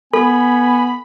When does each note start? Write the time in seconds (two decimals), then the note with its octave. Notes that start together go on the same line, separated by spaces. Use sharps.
0.13 B3 A4 G#5 B5